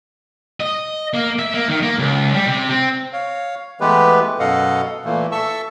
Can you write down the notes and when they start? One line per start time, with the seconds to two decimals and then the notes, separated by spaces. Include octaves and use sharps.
0.60 D#5
1.14 A#3
1.39 E5
1.54 A#3
1.69 D#3
1.82 A#3
1.99 C#2
2.34 G3
2.47 C3
2.69 C4
3.13 C#5 F5
3.80 E3 G#3 A3 B3 G4 B4
4.39 F#2 B2 A4 D#5 F5 F#5
5.05 A#2 E3 A3 A#3
5.32 A4 E5 A5 C#6 E6